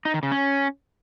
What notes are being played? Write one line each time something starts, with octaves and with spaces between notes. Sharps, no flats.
D#4
D#3
C#3
C#4